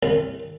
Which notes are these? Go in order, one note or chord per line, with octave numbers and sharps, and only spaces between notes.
C2